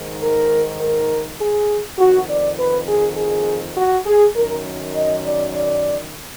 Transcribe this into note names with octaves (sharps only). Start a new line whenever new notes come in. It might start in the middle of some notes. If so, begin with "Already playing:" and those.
Already playing: G#2 D#3
A#4
A#4
G#4
F2 D#3 F#4
D5
B4
G#4
G#4
F#4
G#4
F#2 D#3 A#4
D#5
D5
D5